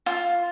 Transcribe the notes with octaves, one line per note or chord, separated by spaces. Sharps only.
F4